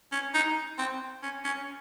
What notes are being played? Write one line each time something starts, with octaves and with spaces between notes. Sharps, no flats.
C#4
D#4
C4
C#4
C#4